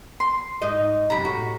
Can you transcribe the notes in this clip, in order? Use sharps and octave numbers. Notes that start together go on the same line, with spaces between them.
C6
G#2 D#4 D#5
F#2 C3 A#5 B5
A2 F#4